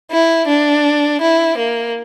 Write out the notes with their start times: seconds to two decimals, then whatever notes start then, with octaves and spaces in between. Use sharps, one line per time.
0.11 E4
0.47 D4
1.21 E4
1.57 A#3